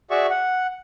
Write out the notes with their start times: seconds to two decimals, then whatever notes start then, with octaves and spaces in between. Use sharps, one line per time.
0.10 F#4 G#4 D5 E5 C#6
0.30 F#5